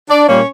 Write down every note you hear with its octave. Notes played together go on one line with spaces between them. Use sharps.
D4 D5
A#2 G3 A#3 C#4 C#5